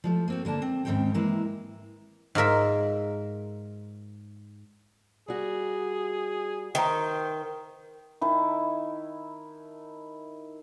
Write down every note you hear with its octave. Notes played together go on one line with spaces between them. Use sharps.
F3 G#3 A3
A#3 C4 F#4
D3 A#3 D4 A5
C4
D#2 G#2 D#3 C4 C#4 G5
E3 G#3 A#3 E4
G#2 F4 A#4 E5
G3 F#4 G#4
D#3 B4 C5 E5 A#5
D#3 E4 A5